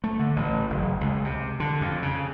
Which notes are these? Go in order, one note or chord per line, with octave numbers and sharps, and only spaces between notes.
A3
D3
A1
F#1
C#2
C3
D3
F2
C#3